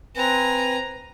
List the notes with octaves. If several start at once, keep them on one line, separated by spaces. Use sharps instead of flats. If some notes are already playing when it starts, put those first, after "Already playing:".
C4 B4 G#5 A#5